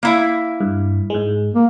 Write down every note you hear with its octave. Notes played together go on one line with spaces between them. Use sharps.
A#3 E4 E5
G2
G#2 G#3
A#3